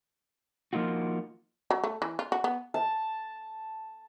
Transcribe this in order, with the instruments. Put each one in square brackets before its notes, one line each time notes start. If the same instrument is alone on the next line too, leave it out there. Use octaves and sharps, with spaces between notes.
[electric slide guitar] F3 A#3 D#4 F4 F#4
[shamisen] F#3
A3
E3
F4
F#4
B3
[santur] A5